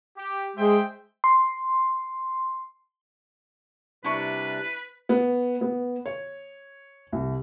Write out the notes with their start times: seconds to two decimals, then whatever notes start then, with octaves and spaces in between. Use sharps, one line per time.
0.17 G4
0.57 G#3 C5 E5 G5
1.24 C6
4.04 C3 G3 D4 E4 B4 C#6
5.09 B3
5.61 B3
6.06 C#5
7.13 C2